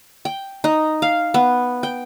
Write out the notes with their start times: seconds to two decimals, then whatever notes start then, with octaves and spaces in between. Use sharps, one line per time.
0.25 G5
0.64 D#4
1.02 F5
1.34 B3
1.83 G5